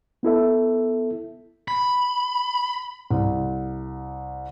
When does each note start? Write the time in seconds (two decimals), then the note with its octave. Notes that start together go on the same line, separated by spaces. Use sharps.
0.23 B3 E4 A4 E5
1.68 B5
3.11 C2